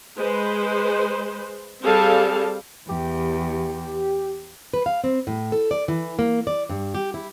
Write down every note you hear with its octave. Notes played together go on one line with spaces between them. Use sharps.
G#3 B4 C5
G3 C4 G#4 A4 F5 A5
E2 G4
B4
F5
C4
A2
A4
D5
E3
A#3
D5
G2
G4
E4